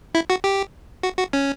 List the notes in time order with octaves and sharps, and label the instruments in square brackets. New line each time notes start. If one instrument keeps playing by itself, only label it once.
[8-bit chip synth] E4
F#4
G4
F#4
F#4
C#4